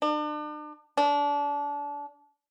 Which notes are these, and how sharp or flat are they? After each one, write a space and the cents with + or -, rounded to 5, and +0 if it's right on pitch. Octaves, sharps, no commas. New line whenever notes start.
D4 +40
D4 -30